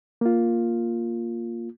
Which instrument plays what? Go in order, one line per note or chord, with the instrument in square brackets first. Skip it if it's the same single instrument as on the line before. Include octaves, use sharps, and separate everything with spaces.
[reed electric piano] A#3 F4